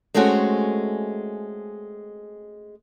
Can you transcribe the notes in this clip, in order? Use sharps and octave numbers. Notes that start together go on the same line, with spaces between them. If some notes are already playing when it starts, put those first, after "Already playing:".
G#3 A3 C4 C#4 F#4